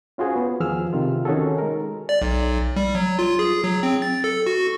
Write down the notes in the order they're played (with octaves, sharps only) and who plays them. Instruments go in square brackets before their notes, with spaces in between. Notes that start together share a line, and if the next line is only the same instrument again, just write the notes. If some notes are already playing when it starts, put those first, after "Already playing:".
[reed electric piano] C#4 F4 F#4 G#4 C5
B3
E2 D#3 F3 G#4 E6 F6
C3 D#3 F4
D#3 C#4 F#4 G#4 A4
G#3 A#4
[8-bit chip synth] D5
B1
G3
F#3
F4
G#4
F#3
C4
A6
A4
F#4